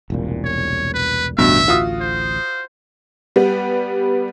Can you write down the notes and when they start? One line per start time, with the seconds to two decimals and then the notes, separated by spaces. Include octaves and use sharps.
0.10 E1 C2 A#2
0.45 C#5
0.94 B4
1.38 A1 D2 G2 B2 E5
1.68 F4 F#4 D#6
2.01 C5
3.36 G3 B3